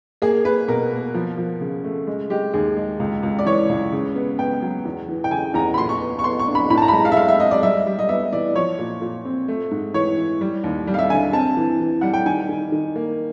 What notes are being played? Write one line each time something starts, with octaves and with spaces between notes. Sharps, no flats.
A#3 G#4
A#3 B4
B2 A#4
A#3
F3
F3
C#3
A3
G#3
G#3 G4
D#2 G#4
G#3
C#2
C#2
D5
E3 C#5
C#2
C#3
B3
B3 G5
F#3
E2
E3
G5
C#3 G#5
E2 A#5
B5
A#2 C6
C#6
B3
C#6
B3 C6
C#6
D4
B5
A2 B5
A5
A#5
B5
G#3 A#5
F5
E5
G#3 F5
E5
G#3 D#5
D5
G3 E5
G3
D#5
B3 E5
E3 D5
F3 C#5
A#2
A#2
C4
A3
G#2
E3 C#5
E3
G3
D#2
G3
F5
E5
D3 G#5
C4 A5
E3
E3
G3 F#5
G5
D#3 G#5
D#3
D#3
A#3